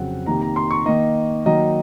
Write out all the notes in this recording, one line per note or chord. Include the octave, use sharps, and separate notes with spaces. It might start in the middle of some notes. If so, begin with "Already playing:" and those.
Already playing: F2 C#3 F#3 C4 F#5
C3 D#3 A#3 D#4 A#5
A#5
C6
C#6
D#3 A#3 D#4 D#5
D#3 F#3 A#3 D#4 D#5